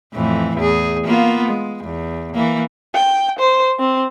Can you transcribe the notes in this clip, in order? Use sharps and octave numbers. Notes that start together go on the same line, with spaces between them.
F2 A2 E3
E2 G#4
A#3 B3 F4
G#3
E2
E3 A#3
G5
C5
C4